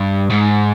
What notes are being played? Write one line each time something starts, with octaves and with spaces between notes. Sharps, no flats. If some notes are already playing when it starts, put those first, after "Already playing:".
Already playing: G2
G#2